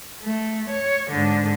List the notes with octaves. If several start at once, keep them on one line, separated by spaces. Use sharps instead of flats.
A3
C#5
G#2 D3